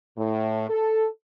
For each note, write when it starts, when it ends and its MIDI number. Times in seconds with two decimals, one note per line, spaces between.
0.18 0.68 45
0.69 1.07 69